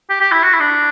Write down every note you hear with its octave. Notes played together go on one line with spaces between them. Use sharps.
G4
G4
E4
F#4
E4
D4